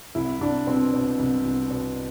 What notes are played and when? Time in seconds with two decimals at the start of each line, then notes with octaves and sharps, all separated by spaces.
0.15 C2 E4
0.40 C2 D4
0.67 B2 C4
0.93 B2
1.19 C2
1.45 C2
1.71 B2